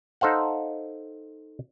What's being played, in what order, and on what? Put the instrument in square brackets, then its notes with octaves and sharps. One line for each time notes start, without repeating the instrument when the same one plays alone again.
[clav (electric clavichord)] D#4 A4 C5 F5 F#5